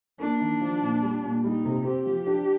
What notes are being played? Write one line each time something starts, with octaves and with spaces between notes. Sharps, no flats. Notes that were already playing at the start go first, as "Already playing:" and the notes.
A#3 D4
D#3
F3
A#2
G3
A#2
G3 D#4
C3
C4 G4
F3
D4